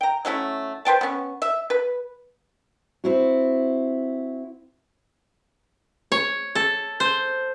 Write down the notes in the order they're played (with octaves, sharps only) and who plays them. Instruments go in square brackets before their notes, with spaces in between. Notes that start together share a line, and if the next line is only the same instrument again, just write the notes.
[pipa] G5 A#5
F#3 A3 C#4 E4
B4 C5 G5 A5
B3 C#4
E5
B4
[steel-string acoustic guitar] C4 E4 F#4
[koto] C#5
A4
C5